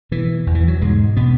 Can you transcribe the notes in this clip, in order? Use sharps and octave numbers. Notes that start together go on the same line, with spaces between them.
B2 E3
E2
E3
F#3
G#2 B2 G#3
B2 B3